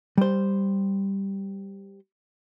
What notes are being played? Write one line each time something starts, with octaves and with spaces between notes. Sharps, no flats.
G3 C5